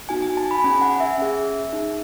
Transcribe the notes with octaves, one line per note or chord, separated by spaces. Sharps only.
B3 D#4 F#4 G#5
G#5
A5
B5
C#4 G#4 G#5
F#5
E5
C#4 G#4
D#4 G#4